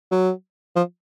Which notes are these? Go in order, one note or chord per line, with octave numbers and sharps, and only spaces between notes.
F#3
F3